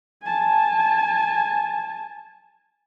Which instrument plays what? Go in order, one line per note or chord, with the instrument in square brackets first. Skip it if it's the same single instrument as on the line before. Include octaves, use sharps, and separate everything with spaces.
[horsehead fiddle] G#5 A5